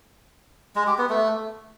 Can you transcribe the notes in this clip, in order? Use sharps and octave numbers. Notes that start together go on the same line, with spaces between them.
G#3
G4
B3
A3